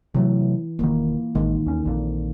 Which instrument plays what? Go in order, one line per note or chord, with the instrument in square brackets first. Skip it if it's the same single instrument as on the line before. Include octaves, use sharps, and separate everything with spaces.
[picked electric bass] C3 F#3 A3 [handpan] E3
[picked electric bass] E1 D#3 [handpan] A#3
[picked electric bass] A1 G#3 [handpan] D#3
[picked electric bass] D#2 C#4
A#1 F2 A#2